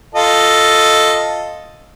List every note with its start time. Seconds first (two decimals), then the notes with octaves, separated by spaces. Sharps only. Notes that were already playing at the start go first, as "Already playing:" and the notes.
0.15 F4 A4 D#5